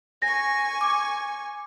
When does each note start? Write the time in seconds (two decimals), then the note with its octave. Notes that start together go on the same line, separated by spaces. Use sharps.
0.22 G#5 C#6 A#6
0.81 D6